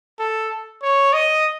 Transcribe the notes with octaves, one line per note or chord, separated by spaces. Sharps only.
A4
C#5
D#5